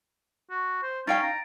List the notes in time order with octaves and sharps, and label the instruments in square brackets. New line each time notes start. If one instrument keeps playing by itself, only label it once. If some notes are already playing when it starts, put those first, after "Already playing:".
[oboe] F#4
C5
[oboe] C#4 [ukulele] D#4 F5 G5 [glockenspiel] A6 D7
[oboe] A#5